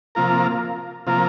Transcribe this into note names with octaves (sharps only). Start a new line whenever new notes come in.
C3 F3 A#3 F4 A#4
C3 F3 A#3 F4 A#4